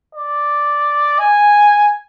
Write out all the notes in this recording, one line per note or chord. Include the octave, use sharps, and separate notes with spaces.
D5
G#5